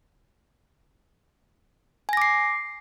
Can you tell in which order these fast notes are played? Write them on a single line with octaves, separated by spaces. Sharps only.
G#5 A#6 D6 C7